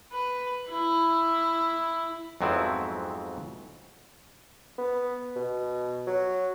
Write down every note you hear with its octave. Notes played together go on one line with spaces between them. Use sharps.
B4
E4
F2 G#2 F#3 B3 C4 E4
B3
B2
F#3